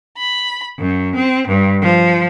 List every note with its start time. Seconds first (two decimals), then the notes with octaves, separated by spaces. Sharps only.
0.18 B5
0.78 F#2
1.16 C4
1.48 G2
1.82 F3